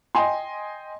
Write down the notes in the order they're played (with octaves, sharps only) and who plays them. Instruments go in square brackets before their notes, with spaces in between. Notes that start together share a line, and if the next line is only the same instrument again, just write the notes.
[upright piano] D#5 G5 G#5 C6